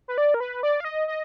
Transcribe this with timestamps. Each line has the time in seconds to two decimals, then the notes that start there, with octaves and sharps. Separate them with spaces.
0.08 B4
0.18 D5
0.34 A#4
0.40 B4
0.63 D5
0.80 F5
0.85 D#5
1.08 D#5